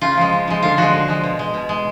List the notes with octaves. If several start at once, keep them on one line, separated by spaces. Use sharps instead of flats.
C#3 F4
F3 G#3
C#3
F3 G#3
D3 F4
F3 G#3 F#4
D3
F3 G#3
B2
G#3
B2
G#3